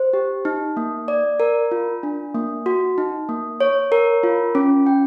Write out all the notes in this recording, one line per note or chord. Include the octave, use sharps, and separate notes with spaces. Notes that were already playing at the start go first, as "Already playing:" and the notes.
Already playing: C5
G4
D#4
A#3
D5
A#4
F4
D4
A#3
F#4
D#4
A#3
C#5
A#4
F4
C#4
G5